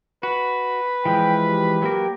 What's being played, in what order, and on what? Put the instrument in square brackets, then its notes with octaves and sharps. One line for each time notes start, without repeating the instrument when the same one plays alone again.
[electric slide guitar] F#4 [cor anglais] B4
[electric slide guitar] E3 F3 G#3 [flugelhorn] G5
[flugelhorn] G4
[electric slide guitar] F#3 A#3 A#4 [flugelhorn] G4